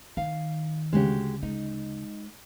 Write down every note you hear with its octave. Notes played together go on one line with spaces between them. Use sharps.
D#3 F5
D2 C#3 G#3 F#4 G4
G#3 D#4